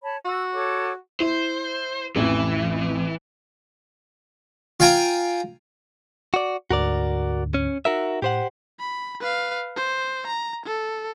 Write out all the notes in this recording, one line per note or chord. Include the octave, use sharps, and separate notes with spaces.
C#5 A5 B5
F#4 E6
A4 C#5 D6
E4 C5
A1 F2 E3
F4 F5 G5 G#5 A#5
F#4 D5
D2 G#2 D3 F#4 A#4 D5
C#4
D#4 F#4 A#4 E5
A2 G4 C5 F#5
B5
B4 F5
C5
A#5
A4